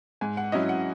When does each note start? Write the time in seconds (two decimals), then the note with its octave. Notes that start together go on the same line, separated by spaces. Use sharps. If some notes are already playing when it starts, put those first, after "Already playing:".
0.21 G#2 G#5
0.37 F#5
0.52 F#3 C#4 E4 D#5
0.69 F#5